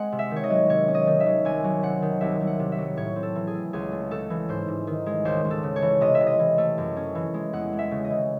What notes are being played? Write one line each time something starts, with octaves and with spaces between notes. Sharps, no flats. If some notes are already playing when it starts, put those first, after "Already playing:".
Already playing: G#3 C4 F#5 G#5
C3
E5
D#3
C#5
D#5
F#3
C3 C#5
C#4
D#5
D#3
E5
F#3
C2 G#5
F#3
C3 F#5
D#3
C2 E5
C2
F#5
C3
E5
F#3
A2 C#5
C4
A4
E3
G#4
A3
C#2 G#4
A3
C#3 A4
E3
G#2 C5
G#2
D#3
G#3
C#2 C5
C#2
A4
C#3
C#5
E3
C3 D#5
E5
C3
D#5
E3
A3
F#2
C#4
E3
G#3
E2 F#5
G#3
E5
C#3
D#5
E3